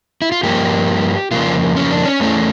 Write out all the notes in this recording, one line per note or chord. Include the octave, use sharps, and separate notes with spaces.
E4
F4
G2 F3 A#3 G4
F2 C#3 F3 A#3 F4
C#4
D4
C#4
E2 E3 A3 C#4